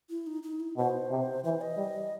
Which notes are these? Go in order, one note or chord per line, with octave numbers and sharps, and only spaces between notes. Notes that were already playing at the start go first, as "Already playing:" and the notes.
E4
D#4
D#4
E4
B2 C5
C3
E3 C5
D#5
G3